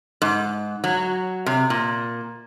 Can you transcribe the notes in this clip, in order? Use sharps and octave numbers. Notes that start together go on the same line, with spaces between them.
G#2
F#3
C3
A#2